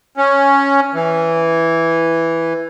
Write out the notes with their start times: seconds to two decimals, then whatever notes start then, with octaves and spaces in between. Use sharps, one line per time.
0.17 C#4
0.94 E3